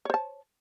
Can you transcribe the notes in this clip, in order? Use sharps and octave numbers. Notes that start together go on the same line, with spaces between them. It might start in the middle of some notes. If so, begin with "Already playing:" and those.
C5 C#5 A5